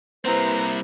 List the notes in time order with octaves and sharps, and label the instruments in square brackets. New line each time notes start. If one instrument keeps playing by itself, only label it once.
[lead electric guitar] G3 C4 [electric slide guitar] A#3 E4 [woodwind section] B4 C5 [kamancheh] A#5